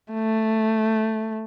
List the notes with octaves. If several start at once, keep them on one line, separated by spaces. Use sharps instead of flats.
A3